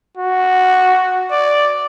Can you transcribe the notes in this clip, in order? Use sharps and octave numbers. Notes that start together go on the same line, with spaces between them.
F#4
D5